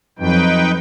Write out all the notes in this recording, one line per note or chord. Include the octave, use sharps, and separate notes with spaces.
F2 F#3 D#4 B4 G5